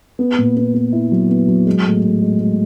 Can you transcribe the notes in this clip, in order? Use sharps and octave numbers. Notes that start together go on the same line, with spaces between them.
B3
A#2
B3
B3
E4
F#3
B3
F#3
G#3
A2
A2
G#3
G#3